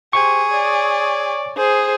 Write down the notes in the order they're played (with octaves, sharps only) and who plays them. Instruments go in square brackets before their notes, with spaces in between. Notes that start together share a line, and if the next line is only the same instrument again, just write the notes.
[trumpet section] G4 C5 [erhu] G#4 [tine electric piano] C#6
[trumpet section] C#5 D5
[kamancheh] G#4 C5